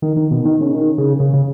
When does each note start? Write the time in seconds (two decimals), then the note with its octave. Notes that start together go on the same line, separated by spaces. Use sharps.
0.02 D#3
0.17 D#3
0.31 B2
0.45 D#3
0.61 C#3
0.75 D#3
0.98 C#3
1.20 C#3
1.33 C#3